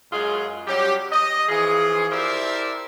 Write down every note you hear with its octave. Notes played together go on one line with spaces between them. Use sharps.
F#2 G#3 F4 G#4
F#3 G3 C#4 G4
D#5
E3 F3 F4 G#4
E4 G4 A#4 C5 D5 E5